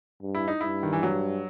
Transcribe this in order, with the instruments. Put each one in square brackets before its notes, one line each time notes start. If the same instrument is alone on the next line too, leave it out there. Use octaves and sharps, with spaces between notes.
[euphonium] G2
[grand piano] E4
D#4
[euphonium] G2 [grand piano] E4
[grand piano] D#3
E3
F#3